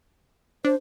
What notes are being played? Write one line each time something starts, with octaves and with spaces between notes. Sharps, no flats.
D4 C5